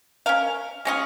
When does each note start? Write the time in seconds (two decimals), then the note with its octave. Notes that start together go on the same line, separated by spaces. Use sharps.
0.26 C#4 A#4 F5
0.85 G#3 C#4 F4 G#4